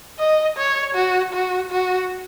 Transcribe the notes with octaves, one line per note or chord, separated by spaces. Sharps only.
D#5
C#5
F#4
F#4
F#4